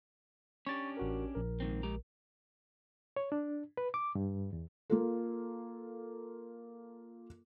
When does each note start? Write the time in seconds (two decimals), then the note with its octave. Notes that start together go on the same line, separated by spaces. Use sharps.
0.67 C#4 D4 G4 C#6 A6
0.97 A1 F#4 A#4
1.35 A#1 A#4
1.60 G#2 D#3 C4
1.83 G#3 G4 A#5
3.16 C#5
3.32 D4
3.77 B4
3.94 D6
4.15 G2
4.53 E2
4.90 A#3 F4 A4